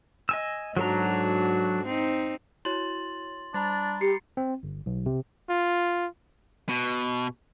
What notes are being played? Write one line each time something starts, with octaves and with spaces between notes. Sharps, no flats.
D#5 G#5 E6
G#2 F#3 D4 F#4 A4 A#5
C4 D#4
E4 F#4 C#5 C6 A6 F#7
G3 D4 A#5 B5 A6
G4 C7 C#7
C4
G1
B1
C3
F4
B2